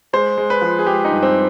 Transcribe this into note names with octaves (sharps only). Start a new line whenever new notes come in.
G#3 C5
G#3
B4
F3
G#4
G#3 G4
D#4
G2
C4